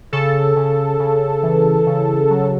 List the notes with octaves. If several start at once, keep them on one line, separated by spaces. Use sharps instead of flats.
C#3 A4
C#3
C#3
E3
C#3
F#3